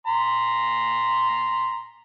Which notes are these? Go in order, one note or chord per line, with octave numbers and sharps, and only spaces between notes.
A#5 C6